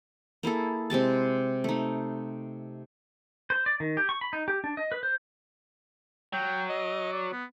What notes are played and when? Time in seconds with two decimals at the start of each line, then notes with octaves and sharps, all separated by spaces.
0.43 A#3 E4 G#4 A4
0.90 C3 G#3 G4 A5
1.64 A3 D#4
3.50 C5
3.66 D5
3.80 D#3
3.97 G4
4.09 C#6
4.21 B5
4.33 D#4
4.48 G4
4.64 D4
4.77 D#5
4.92 B4
5.03 C5
6.33 F#3 G5
6.69 D#5
7.12 D5
7.32 B3